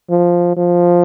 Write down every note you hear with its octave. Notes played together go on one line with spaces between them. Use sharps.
F3
F3